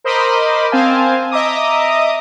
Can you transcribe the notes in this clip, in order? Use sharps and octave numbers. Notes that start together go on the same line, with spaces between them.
A#4 C5 D#5 B5 C6 D6
C4 C5 F5 G#5 A5
D#5 E5 A#5 D6 D#6